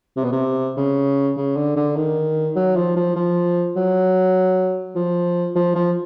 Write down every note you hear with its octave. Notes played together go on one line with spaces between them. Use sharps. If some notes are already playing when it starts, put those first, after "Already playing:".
C3
B2
C3
C#3
C#3
D3
D3
D#3
F#3
F3
F3
F3
F#3
F3
F3
F3